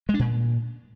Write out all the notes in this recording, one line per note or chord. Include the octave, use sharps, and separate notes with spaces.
G#3
D4
A#2